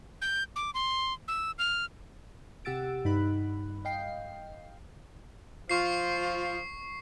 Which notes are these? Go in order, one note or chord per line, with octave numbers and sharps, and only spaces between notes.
G6
D6
C6
E6
F6
C3 G4 F#5 E6 A6 D7
G2 D#4 B5 F#6
D#5 F5 G5 C7
F3 F4 C#6 C7